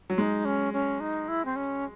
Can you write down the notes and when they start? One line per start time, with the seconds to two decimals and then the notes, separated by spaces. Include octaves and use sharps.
0.10 F#3
0.18 G#3 D#4
0.45 C#4
0.73 C#4
1.00 D#4
1.28 E4
1.45 C4
1.56 C#4